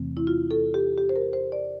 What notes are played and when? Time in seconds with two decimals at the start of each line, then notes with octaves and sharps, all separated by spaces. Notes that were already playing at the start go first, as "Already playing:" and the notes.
Already playing: E2 C3 E3 A3 C4
0.17 E4
0.27 F4
0.51 A4
0.74 G4
0.98 G4
1.09 C5
1.16 A#4
1.33 C5
1.52 D5